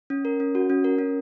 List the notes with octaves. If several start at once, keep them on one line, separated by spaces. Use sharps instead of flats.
C#4
A#4
C#4
F#4
C#4
A#4
C#4